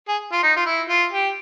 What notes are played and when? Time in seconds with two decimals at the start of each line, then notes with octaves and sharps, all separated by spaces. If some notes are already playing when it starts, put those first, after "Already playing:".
0.08 G#4
0.32 F4
0.43 D#4
0.57 F4
0.66 E4
0.89 F4
1.12 G4